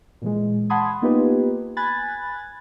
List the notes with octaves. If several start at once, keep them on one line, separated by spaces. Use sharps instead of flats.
A#2 E3 G#3
F#5 A5 B5 C6 D#6 G#6
A#3 B3 D#4 F4 G4 B4
G#5 B5 F#6 G#6 A6